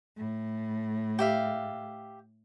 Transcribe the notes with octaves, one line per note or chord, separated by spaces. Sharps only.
A2
G4 E5 F5